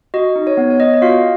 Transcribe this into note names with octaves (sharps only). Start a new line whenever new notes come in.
F#4 D#5
D#4
C#5
B3
C#5
B3 D#5
D#5
F4 F#4 F5